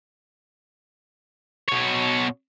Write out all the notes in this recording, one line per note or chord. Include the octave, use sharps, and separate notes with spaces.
B2 C#5